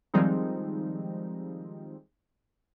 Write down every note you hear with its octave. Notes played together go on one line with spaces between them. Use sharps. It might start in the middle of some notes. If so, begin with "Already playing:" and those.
D#3 F3 G3 G#3 C4 D#4